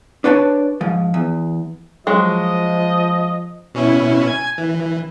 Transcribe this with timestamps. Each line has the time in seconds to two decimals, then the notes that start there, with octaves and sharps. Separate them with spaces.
0.24 D4 B4 C#5 D5 A5
0.81 G#2 F3
1.14 E2
2.07 F3 F#3 G#3 D#5
3.74 B2 C#4 E4
4.28 G#5 G#6
4.58 E3